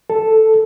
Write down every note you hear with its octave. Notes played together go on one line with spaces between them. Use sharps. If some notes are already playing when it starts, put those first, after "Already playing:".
A4